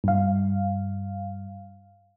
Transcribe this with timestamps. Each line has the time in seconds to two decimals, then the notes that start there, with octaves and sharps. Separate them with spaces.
0.04 G2 F5